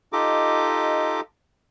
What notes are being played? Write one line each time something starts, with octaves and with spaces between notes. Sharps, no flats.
D#4 F4 G4 A4 D#5 D6